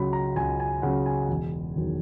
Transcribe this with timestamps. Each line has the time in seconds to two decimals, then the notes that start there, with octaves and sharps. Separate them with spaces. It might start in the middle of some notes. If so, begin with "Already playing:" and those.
Already playing: C#2 C#3 F#3 B5
0.13 A#5
0.35 C#2 G#5
0.60 G#5
0.82 C#3 F#3 F#5
1.06 G#5
1.29 E1
1.76 E2 D#3 F#3